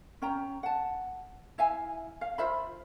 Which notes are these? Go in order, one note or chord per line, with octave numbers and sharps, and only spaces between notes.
C#4 G5 A#5
F#5 A5
E4 E5 F5 G#5
F5
F4 C5 E5 B5